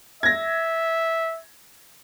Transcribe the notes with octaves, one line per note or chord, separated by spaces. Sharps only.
E5 G#6 A#6